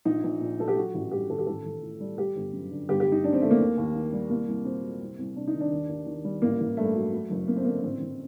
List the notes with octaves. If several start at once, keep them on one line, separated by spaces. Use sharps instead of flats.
A#1 D#4
A#1
A#2
F#3 A4
G4
F#3 F#4
A1
G2 G4
D#3 A4
G4
A1 A4
A1
A2
G3
G3 G4
G1
F#2
D3
G1 G4
G4
G1
D#4
F#2 D4
C4
D#3 A3
A#3
D#2
D#2
D#3
G3
C2 A#3
C2
A#2 C4
F#3
C2
C2
C3 D4
D#4
D#3
D4
D#2
D#2
D#3
G3
A1 A#3
A1
G2 A3
F#3
F#3
F#1
F#2 A#3
C4
D3 A#3
A1 C4
A1